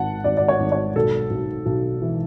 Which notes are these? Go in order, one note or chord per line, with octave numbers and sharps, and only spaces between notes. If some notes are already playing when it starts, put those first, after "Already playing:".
Already playing: G#1 F#5 A5
G#1 D5
D5
C#5
G#1
C#5
B1 A4
B1
B1
E3